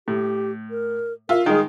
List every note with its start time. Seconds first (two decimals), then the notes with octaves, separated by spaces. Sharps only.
0.08 A2 G4
0.70 A#4
1.29 F4 A#4 E5
1.46 D#3 G#3 G#4